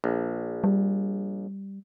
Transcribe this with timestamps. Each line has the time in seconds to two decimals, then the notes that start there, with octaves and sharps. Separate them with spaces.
0.04 A#1
0.64 G3